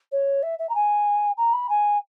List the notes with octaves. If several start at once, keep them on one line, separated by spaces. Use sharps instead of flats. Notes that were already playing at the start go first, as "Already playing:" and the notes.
C#5
E5
E5
A#5
G#5
A#5
B5
G#5